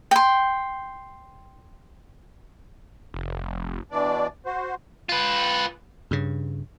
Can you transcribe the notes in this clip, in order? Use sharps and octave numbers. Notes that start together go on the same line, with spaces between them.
G5 C6
F1
B2 E3 D4 D5
F#4 C5
F4 B4
G2 C#3